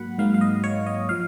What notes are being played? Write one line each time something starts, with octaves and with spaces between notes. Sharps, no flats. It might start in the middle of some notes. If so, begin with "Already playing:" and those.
Already playing: G#2 F#3 A#3 F#5 B5
G#2 F#3 A#3 F5
F5
D#5
C#5
D#5
F3 F5